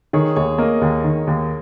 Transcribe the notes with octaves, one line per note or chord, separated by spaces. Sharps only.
D#3 G#4 C#5
D#2 G#4 C#5
A#3 A#4 D#5
D#2
D#3
D#2